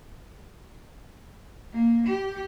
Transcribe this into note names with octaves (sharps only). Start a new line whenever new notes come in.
A#3
G4